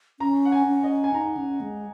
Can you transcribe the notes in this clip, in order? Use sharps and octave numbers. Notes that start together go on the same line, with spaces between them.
C#4 A#5
F#5
G#5
C#4
D#5
G#5
D#4 A#5
C#4
G#3